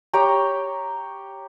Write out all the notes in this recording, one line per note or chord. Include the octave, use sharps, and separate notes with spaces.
G4 C#5 G5 A#5